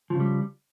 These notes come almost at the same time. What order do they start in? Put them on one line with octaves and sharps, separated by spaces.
F3 C#3 G3